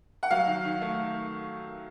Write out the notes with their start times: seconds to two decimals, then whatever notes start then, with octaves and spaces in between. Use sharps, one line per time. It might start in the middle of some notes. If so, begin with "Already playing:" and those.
0.23 F#5
0.31 F#3 F5
0.47 D#3
0.64 D#3
0.81 A3